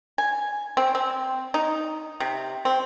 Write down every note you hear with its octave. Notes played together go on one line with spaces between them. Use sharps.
G#5
C4
C4
D#4
C3
C4